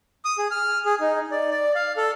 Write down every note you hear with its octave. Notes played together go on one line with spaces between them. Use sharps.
D#6
G#4
F6
G#4
D#4
D5
D5
F5
A4